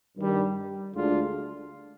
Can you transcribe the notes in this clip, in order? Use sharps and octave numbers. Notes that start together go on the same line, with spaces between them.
G2 D#3 G3
D2 D3 G#3 D4 F4